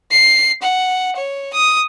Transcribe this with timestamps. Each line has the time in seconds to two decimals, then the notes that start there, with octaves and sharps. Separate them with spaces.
0.11 C7
0.62 F#5
1.16 C#5
1.53 D#6